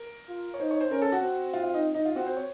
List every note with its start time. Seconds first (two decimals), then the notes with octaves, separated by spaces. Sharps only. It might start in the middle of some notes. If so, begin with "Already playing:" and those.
Already playing: A#4
0.29 F4
0.54 C#5
0.60 D#4 C5
0.71 C#5
0.81 C5
0.91 C#4 A#4
1.02 A4
1.12 F#4
1.22 C4
1.53 F4
1.64 F4
1.74 D#4
1.94 D#4
2.05 F4
2.15 C4 F#4
2.26 C5
2.37 C#5